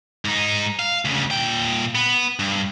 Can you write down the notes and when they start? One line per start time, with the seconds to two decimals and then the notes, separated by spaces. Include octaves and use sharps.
0.25 G#2 D#4
0.79 F5
1.05 D2 C#3
1.31 A#2 G5
1.95 B3
2.39 G2